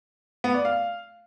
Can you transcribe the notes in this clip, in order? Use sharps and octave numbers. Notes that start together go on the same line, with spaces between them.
B3
D5
F5